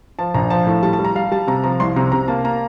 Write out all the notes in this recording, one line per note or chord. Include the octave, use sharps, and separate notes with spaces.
F3 A5
A#1 A#5
F3 A5
A2
G3 A5
A5
G3
A#5
G3 F5
G3 A5
C3 A#5
F3 A#5
C2 C6
C3 A#5
C3 A#5
A#3 A5
A#3 A#5